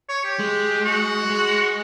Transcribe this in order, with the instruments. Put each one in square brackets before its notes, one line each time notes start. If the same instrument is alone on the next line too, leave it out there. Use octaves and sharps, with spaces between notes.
[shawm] C#5
G4
[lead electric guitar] G#3
[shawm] F#4
[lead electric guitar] G#3